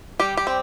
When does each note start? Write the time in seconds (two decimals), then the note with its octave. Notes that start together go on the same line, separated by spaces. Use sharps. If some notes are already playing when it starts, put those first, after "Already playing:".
0.20 G3 G4
0.37 G4
0.47 C4